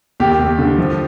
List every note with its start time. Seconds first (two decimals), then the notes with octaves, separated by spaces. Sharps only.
0.20 D#2 G4
0.39 D#2
0.59 D3
0.78 F3